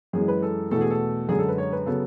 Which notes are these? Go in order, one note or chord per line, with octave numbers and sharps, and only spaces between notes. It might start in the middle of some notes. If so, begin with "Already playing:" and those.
F#2 E3 G#3 G#4
B4
A4
E2 B2 A3 A4
G#4
A4
F#2 D3 G#3 G#4
A4
B4
C#5
B4
C#3 F#3 B3 A4